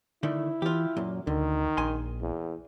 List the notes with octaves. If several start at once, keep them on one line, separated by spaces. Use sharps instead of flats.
D3 D#3 A3 E4
E3 F4 G4
F#2 A#2 F#3
D2 D3 D#3
A#1 G#5 C6
E2